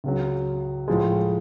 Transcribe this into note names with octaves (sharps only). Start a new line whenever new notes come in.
C#2 C#3 F#3
A2 F3 G#3